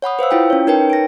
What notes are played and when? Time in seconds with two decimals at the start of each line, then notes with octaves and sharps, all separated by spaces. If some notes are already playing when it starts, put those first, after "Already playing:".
0.02 C#5 F#5 B5 D#6
0.19 B4 C5 F5 E6
0.31 E4 F4 G5
0.50 C#4 C#5
0.67 D#4 A#4 B4 C#5 G5
0.90 A#6 D7